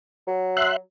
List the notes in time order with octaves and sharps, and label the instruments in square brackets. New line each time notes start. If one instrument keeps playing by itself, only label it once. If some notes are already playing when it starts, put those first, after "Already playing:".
[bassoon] F#3
[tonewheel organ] E5 C6 F#6